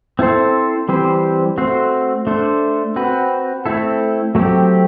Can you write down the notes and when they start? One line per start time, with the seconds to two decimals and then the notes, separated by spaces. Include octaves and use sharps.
0.19 C4 E4 A4 C5
0.89 E3 G3 C4 G4 C5
1.58 A3 C4 F#4 C5
2.27 A3 D4 A4 C5
2.96 C4 F#4 B4
3.66 A3 C4 E4 A4
4.35 F#3 A3 C4 G4